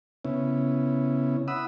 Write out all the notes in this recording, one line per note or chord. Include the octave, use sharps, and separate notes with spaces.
C#3 B3 C#4 E4
E4 F#5 B5 D#6 E6